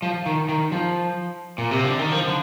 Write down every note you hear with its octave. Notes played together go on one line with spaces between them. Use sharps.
F3
D#3
D#3
F3
A#2
C3
D3
D#3
F3
D3